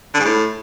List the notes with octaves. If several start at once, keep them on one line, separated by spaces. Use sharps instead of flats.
D3
G#2
A2